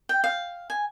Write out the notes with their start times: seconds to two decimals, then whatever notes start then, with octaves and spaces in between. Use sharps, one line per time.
0.09 G5
0.24 F5
0.70 G#5